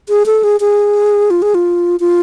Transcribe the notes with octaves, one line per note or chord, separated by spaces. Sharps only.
G#4
A4
G#4
G#4
F4
G#4
F4
F4